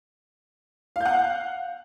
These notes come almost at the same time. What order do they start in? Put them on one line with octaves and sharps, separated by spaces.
F5 G6 F#5